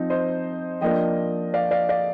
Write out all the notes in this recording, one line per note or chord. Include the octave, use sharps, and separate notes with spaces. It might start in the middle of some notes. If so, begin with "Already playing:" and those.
Already playing: F3 C4 D#4
C5 D#5
F3 A#3 D4 D#5 G5
D5 F5
D5 F5
D5 F5